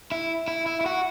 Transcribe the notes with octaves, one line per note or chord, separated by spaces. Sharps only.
E4
E4
E4
E4
F#4